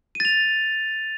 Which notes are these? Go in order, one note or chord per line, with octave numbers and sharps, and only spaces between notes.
A6 D#7 F7